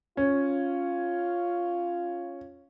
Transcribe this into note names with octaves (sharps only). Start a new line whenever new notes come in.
C#4 F4